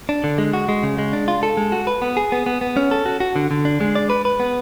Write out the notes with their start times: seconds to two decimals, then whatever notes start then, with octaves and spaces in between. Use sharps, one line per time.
0.09 D4
0.24 D3
0.38 G#3
0.53 F#4
0.69 G#3
0.83 C#3
0.98 G#3
1.13 D4
1.28 F4
1.43 A4
1.57 G#3
1.72 F#4
1.87 B4
2.02 B3
2.17 G#4
2.32 B3
2.46 B3
2.61 B3
2.77 C#4
2.91 A4
3.06 F#4
3.20 F#4
3.36 D3
3.51 D3
3.65 D4
3.81 G#3
3.95 D5
4.10 B4
4.25 B4
4.40 B3